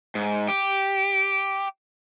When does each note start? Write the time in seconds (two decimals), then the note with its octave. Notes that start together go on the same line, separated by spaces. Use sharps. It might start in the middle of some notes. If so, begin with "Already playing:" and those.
0.15 G#2
0.48 G4